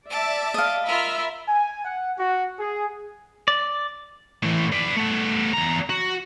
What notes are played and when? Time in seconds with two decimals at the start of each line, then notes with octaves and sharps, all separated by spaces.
0.10 D5 E5 A5 D6
0.54 D#5 F5
0.86 F4 A#4 E5 B5
1.48 G#5
1.85 F#5
2.19 F#4
2.60 G#4
3.48 D5
4.43 A2 E3
4.73 B4 D5
4.97 A3 B3
5.54 E2 A#5
5.90 F#4